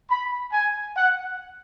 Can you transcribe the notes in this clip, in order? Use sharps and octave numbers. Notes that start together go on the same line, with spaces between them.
B5
G#5
F#5